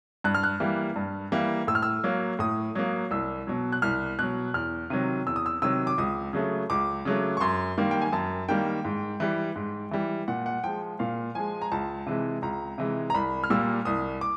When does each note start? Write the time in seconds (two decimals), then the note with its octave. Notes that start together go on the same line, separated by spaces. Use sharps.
0.24 G2 F#6
0.35 F6
0.43 F#6
0.60 E3 G3 A#3
0.96 G2
1.32 E3 G3 A#3
1.67 A2 E6
1.75 F6
1.83 E6
2.04 F#3 A#3
2.39 A2 D#6
2.75 F#3 A#3
3.11 C2 E6
3.47 B2 F#3
3.72 F#6
3.82 C2 F6
4.19 B2 F#3 F#6
4.54 E2 F6
4.90 C3 D#3 F#3
5.26 E2 E6
5.36 D#6
5.46 E6
5.62 C3 D#3 F#3 E6
5.87 D6
5.98 C#2 D#6
6.33 C#3 F#3 A3
6.70 C#2 D6
7.05 C#3 F#3 A3
7.37 C#6
7.40 F#2 C6
7.78 D#3 G3 A#3
7.91 G5
8.02 G#5
8.13 F#2 A5
8.48 D#3 G3 A#3 G5
8.85 G#2
9.20 E3 G3
9.56 G#2
9.91 E3 G3
10.28 A#2 F#5
10.46 F#5
10.64 F3 G#3 G5
10.99 A#2 F5
11.35 F3 G#3 G#5
11.62 A#5
11.72 C#2 A5
12.06 C3 E3 G#3
12.42 C#2 A#5
12.78 C3 E3 G#3
13.10 A#5
13.14 C2 B5
13.44 F6
13.50 A#2 G3 A#3 E6
13.85 C2 D#6
14.21 D6